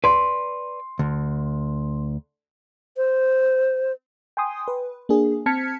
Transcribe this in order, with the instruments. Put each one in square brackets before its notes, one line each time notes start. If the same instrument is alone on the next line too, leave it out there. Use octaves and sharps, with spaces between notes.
[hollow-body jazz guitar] B4 D5 [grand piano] C6
[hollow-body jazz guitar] D2
[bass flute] C5
[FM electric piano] G5 G#5 C6 D#6
B4
A#3 D4 G#4
C4 A5 F6 G#6 B6 C#7